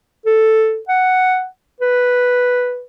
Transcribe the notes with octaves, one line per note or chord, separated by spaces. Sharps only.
A4
F#5
B4